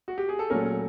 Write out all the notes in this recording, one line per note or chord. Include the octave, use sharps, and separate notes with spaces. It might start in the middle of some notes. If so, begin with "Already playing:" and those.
F#4
G4
G#4
A4
A#2 F#3 A3 C#4 A#4